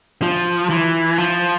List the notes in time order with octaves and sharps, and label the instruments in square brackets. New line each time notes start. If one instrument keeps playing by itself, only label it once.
[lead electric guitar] F3
E3
F3